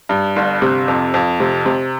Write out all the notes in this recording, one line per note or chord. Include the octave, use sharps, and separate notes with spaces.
G2
G1
C3
F2
F2
C3
C3